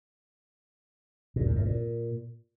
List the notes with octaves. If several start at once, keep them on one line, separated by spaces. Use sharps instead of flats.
A#2
F#2
A2
A#2